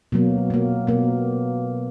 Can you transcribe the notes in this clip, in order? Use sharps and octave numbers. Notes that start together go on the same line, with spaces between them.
B2 F#3 A#3
B2 A#3
B2 A#3